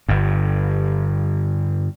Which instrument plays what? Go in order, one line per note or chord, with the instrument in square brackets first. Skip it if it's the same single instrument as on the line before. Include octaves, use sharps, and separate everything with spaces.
[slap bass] G1 G2